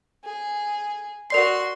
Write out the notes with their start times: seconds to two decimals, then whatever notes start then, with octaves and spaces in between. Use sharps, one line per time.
0.24 G#4
1.30 F#4 A#4 D5 C6 C7